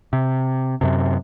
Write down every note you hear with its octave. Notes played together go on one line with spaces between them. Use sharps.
C3
F#2 C3